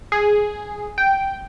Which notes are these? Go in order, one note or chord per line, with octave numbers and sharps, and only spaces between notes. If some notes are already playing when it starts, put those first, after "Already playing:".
G#4
G5